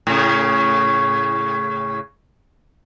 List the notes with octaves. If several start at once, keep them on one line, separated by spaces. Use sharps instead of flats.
A2 C#3